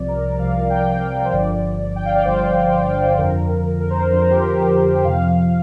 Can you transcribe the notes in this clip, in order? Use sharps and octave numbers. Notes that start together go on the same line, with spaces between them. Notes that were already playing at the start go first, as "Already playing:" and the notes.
Already playing: C2 C3 F3 D5
A#4
C2 C3 F3 F5
G5
C5
G1 G2 D3 F3 D5
G5
F5
D5
G1 G2 D3 F3 C5
F2 D3 F3 A#4
A#4
C5
A#4
F2 D3 F3 C5
A#4
G4
A#4
G4
G5
F2 C3 F3 F5